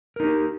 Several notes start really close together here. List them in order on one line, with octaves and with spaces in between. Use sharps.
A#4 D#4 G4